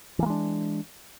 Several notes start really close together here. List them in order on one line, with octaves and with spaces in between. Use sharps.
E3 A#3 G#3 D4